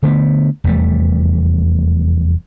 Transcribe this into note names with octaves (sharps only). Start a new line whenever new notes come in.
D3 A3 B3
F1 E2 G3 A3